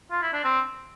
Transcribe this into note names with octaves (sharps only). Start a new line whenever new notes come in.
F4
E4
D4
C4